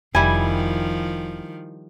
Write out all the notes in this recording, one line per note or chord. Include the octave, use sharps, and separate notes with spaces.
F1 D#3 F3 G3 E4 G#5